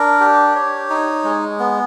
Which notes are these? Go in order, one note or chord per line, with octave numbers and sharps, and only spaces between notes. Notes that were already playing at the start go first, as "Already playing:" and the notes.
Already playing: D4 A#4
G4
C#5
D#4
G#3
B3